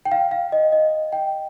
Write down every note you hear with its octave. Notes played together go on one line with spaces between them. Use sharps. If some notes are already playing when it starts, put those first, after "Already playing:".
G5
F5
F5
D#5
D#5
G5